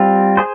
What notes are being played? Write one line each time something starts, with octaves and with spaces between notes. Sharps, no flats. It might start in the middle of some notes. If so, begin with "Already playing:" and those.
Already playing: G3 C4 F4
G#4 C5